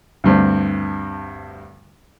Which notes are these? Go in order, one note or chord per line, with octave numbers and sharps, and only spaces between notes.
D2 G2 C4